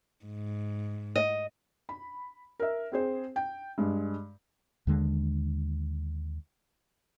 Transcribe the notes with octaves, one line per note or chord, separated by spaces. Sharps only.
G#2
D#5
B5
A#4 E5
C4 G#4 C5
G5
G2 G#3
D#2 D3 G#3